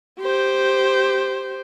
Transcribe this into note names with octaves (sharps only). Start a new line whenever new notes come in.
G4 C5